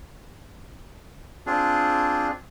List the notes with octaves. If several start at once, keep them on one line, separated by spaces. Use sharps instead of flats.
C4 D4 F4 G#4